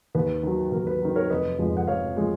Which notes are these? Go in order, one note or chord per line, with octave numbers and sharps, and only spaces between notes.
D#2 B4
D#3 F#3
D#2 A#4
B4
D#3 F#3
A#4 C#5
F1 B4 D#5
F2 F3 G#3
F#5
F1 C#5 F5
F3 G#3